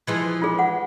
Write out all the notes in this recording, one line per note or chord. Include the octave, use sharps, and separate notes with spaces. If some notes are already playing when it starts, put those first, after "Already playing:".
E3 F3 G#3
F4 G#4
F#5